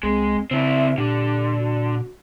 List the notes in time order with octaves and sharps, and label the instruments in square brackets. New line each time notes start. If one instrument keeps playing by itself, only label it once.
[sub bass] C2 [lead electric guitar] G#3 [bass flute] C4
[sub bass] C#3 [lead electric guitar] C4 E4 [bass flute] E5
[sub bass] A#2 [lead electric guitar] D3 [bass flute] G4
[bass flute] F#4